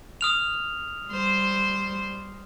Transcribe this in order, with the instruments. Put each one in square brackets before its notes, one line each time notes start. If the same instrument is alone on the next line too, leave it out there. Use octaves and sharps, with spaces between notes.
[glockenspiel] D#6 F6 F7
[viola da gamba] G3 C5